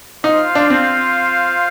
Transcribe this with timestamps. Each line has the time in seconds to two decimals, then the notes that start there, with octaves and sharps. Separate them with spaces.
0.24 D#4 F4 C5 F5
0.55 D4
0.70 C4